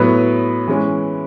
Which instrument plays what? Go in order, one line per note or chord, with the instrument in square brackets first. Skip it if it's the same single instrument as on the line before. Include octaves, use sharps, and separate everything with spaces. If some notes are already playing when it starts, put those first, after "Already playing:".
Already playing: [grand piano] A2 F#3 B3 B4
E3 G#3 C#4